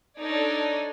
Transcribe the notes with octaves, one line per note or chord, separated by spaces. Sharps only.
D4 D#4 A4 C#5 D5